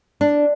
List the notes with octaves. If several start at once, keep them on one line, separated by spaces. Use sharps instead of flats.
D4